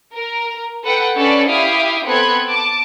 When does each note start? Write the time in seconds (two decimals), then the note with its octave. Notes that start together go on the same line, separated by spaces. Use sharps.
0.13 A#4
0.83 A4 B4 F#5 G5
1.16 C#4 D4 A4 B4 D5
1.48 E4 G4 E5 F5 D#6 D7
2.06 B3 C4 A4 B5 F#6 G#6
2.48 A5 D6